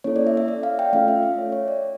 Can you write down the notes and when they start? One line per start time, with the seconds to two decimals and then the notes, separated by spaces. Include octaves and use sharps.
0.04 A#3 C#4 E4 A4 C#5
0.16 D5
0.27 E5
0.37 E5
0.48 D5
0.63 F5
0.79 G5
0.93 A3 C#4 F4 A4 F5
1.08 E5
1.23 E5
1.38 C#5
1.52 C#5
1.68 D5